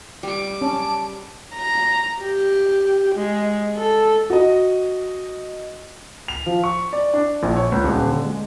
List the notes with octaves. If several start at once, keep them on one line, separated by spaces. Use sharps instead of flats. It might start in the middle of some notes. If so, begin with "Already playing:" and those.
G3 D6 D7
C#4 A5
A#5
G4
G#3
A4
F#4 D#5
F7
F3
C#6
D5
D4
A#1
C#5
C#2
D#1
D3
G#3